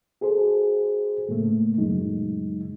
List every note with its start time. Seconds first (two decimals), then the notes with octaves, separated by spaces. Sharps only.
0.21 F#4 G#4 A4 C5
1.29 A2 C#3 A3 A#3
1.78 F#2 A#2 C#3 F#3 G#3 D#4